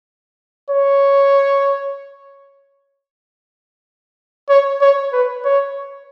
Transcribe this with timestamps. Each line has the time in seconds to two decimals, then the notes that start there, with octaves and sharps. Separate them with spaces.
0.70 C#5
4.49 C#5
4.81 C#5
5.12 B4
5.44 C#5